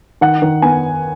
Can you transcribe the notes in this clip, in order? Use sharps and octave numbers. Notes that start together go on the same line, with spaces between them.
D#3 F#5
D#3
B3 G#5